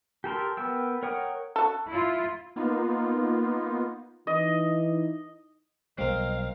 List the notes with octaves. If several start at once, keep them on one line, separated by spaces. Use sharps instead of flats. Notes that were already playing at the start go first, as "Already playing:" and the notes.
G4 A4 A#4 C6
B3 A#4 G5 E6
A#4 C#5 F#5 G5 D#6
F#4 A4
E4 F4
A#3 B3 D#4 F4
E3 D#4 E4 D#5
B1 G3 C4 A#4 D#5 F5